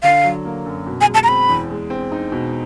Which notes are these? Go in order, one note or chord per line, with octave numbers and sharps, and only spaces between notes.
D3 F5
F#3
A#3
F#2
B2
G#5
G#3
A5
A#5
C4 B5
E2
G#3
C4
D#4
B2